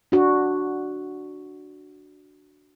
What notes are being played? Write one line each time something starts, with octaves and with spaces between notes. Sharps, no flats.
D4 F#4